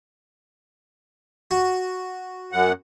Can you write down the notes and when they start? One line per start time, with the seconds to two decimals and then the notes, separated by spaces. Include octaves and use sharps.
1.51 F#4
2.52 F#2 F#5